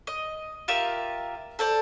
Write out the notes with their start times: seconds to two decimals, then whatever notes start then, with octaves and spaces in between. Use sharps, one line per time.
0.07 D#5
0.68 F4 G4 A#4 E5
1.59 A4 C5 D5